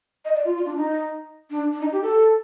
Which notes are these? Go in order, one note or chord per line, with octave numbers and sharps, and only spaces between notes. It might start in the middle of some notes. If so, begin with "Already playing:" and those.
D#5
D5
F4
F4
D4
D#4
D4
D4
D#4
G4
A4